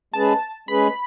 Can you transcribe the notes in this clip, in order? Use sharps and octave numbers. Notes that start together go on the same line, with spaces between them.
G#3 C#4 G#4 B4 A5
G#3 C#4 G#4 B4 B5